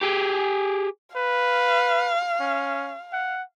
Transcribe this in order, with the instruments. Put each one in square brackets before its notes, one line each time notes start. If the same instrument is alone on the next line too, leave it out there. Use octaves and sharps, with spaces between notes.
[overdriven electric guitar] G4 G#4
[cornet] B4 [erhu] F5
[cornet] C#4
F#5